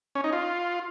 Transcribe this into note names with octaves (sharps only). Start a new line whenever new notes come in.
C#4
D#4
F4